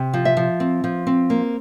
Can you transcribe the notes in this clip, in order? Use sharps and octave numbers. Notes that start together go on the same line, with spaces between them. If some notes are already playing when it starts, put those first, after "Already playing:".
Already playing: C3
F3
E5
F3
C4
F3
C4
A#3